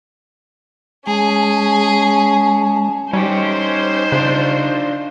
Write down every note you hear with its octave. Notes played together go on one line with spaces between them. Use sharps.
G#3 C#4 G#4 A5
G3 C#4 D#4 G4 C5
C#3 D4 F4